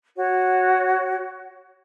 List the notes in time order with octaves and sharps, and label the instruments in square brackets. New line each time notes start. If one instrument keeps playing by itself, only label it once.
[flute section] F#4 C#5